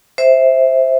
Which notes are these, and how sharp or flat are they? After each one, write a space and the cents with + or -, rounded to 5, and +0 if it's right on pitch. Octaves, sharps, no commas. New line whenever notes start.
C5 +0 E5 -5